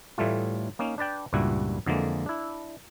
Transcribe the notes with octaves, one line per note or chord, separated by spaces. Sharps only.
A2 E3 G3 A3 F4
A#3 C#4 D#4
D4 B4 D5 G5
C#2 G2 A#2 G3 E4 F#4
F2 D3 E3 G#3 A#3
D4 E4